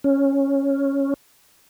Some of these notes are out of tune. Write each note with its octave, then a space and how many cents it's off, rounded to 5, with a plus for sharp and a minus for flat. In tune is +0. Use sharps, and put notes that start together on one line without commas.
C#4 -5